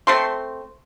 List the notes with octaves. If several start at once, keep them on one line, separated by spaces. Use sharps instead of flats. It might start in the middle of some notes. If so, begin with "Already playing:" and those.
A3 C4 C6